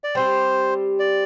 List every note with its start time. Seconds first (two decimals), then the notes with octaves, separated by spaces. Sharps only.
0.04 D5
0.15 G3 C4 G4 C5
0.99 D5